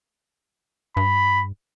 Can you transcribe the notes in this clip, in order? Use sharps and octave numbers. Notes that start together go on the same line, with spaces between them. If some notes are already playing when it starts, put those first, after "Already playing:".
G2 B5